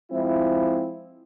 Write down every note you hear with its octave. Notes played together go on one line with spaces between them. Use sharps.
F3 G#3 C4 E4